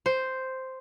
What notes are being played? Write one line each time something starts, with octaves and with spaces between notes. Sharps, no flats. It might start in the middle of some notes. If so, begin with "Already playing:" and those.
C5